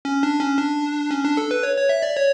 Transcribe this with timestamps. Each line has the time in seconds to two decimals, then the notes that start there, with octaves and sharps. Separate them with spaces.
0.05 C#4
0.23 D4
0.40 C#4
0.58 D4
1.11 C#4
1.24 D4
1.37 A4
1.51 B4
1.63 C#5
1.77 C#5
1.89 E5
2.03 D5
2.17 C#5